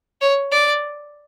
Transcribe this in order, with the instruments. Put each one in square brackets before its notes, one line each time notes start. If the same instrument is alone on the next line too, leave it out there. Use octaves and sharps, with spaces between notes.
[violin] C#5
D5